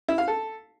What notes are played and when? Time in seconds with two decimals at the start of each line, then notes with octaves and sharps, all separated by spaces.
0.08 E4
0.18 F5
0.28 A4